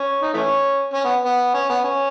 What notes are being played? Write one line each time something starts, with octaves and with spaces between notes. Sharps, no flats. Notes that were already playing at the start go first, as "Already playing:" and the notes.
Already playing: C#4
D#4
E3 A3 C#4
C#4
B3
B3
C#4
B3
C#4